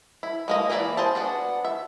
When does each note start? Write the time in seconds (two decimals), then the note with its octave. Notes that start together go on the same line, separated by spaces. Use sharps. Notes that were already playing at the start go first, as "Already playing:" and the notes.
0.23 E4
0.48 G#3 A#3 D#5
0.70 E3 A#3 E4 F#4 D5
0.97 G#4 C5 A5
1.15 B3 D4 F#4
1.65 E5